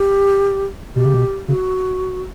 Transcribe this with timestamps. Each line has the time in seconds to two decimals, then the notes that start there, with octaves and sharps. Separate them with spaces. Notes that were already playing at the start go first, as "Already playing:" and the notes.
Already playing: G4
0.96 B2 G4
1.05 C#3
1.14 B2
1.48 C#3 F#4